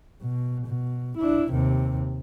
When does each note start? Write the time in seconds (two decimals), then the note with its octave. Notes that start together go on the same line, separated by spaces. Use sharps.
0.21 B2
0.67 B2
1.18 D4 E4
1.51 D#2 C3